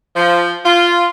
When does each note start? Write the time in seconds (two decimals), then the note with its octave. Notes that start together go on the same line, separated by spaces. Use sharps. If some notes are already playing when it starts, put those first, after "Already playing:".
0.16 F3
0.65 F4